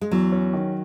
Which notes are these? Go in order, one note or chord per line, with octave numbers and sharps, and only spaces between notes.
G#3
E2 F#3
C#4
D#3